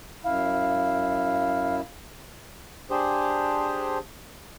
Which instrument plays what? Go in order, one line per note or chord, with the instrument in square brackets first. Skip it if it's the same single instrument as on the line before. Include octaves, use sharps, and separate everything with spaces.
[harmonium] F#2 E4 [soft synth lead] F5
[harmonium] D4 G4 G#4 C5